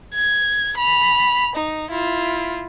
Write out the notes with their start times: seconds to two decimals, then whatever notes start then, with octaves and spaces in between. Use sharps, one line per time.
0.14 G#6
0.77 B5 F7
1.56 D#4
1.91 E4 F4